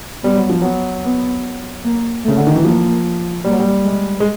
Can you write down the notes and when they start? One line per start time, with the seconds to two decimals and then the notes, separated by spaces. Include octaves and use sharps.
0.24 G3 B3
0.36 F#3
0.50 F3
0.62 F#3 B3
1.04 B3
1.84 A#3
2.25 C#3 A3
2.37 D3
2.47 D#3
2.56 E3
2.65 F3 A#3
3.45 G3 A#3
3.52 F#3
3.60 G3
3.85 G#3
4.20 G#3